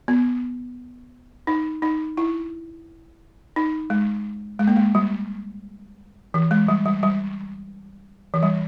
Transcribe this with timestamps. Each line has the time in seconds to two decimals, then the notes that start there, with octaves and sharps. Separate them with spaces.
0.08 B3
1.47 D#4
1.82 D#4
2.17 E4
3.56 D#4
3.90 G#3
4.59 G#3
4.67 A#3
4.77 G#3
4.95 G3
6.34 E3
6.51 G#3
6.68 G3
6.86 G3
7.03 G3
8.34 E3
8.43 G3